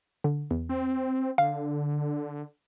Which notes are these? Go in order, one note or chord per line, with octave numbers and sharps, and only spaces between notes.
D3
E2
C4
D3 F5